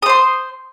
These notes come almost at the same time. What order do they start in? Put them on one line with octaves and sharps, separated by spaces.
D#6 C5 C6